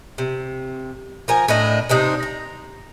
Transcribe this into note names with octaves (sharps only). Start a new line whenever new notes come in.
C3
F3 A#4 G#5
A2 D4 D#5
C3 D4 D#4 C5
A#5